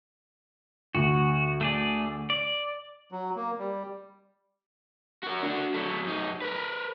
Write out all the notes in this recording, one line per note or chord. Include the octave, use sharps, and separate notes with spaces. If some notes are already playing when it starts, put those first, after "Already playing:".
D2 F#4
A3 G#4 D5
D5
F#3
A#3
G3
F#4 A#4
D4 F#4
F#3 A3
F#2 D#4
A#4 B4